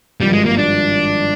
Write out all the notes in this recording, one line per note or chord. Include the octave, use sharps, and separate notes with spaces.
G#1 G2 F3 G3
G#3
A#3
D4